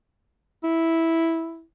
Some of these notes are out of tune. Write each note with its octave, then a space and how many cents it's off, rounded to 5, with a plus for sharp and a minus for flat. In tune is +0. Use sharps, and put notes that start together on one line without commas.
E4 -5